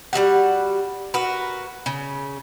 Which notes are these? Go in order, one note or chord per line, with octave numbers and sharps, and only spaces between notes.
G3 G#3 F#4 F#5
F#4 A#4 B4
C#3